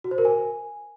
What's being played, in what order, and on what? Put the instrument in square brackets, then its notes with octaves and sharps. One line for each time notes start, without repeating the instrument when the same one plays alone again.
[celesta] F#4
C5
A#4
G#5